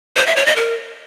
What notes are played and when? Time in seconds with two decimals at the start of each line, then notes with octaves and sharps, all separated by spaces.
0.17 C5
0.27 E5
0.36 C#5
0.46 D#5
0.56 A#4